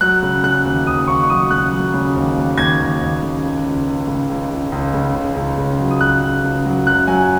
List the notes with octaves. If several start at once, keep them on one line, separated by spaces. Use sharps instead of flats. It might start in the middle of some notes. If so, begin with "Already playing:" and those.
F#3 F#6
C#3
C#3 F#6
D#2
D#2 D#6
D#2 C#6
C#6
F#3 D#6
C#3 F#6
F#3
C#3
D#2
D#2
D#2 G#6
D#2
D#2
C#3
C#2
C#2
C#2
C#3
C#2
C#2
C#2
C#3
C#3
C#2
C#3
F#3
D#6
C#2 F#6
C#2
C#2
F#3
F#2 F#6
F#3 G#5